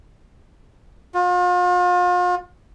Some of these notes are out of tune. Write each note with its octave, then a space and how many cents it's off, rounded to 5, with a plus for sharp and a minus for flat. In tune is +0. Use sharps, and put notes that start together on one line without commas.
F4 +40